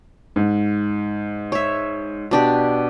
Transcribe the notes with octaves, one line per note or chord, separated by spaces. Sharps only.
G#2
C#5 E5
B2 D4 G4